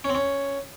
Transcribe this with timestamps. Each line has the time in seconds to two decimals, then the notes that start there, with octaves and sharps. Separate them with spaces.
0.04 C#4
0.10 C4
0.15 C#4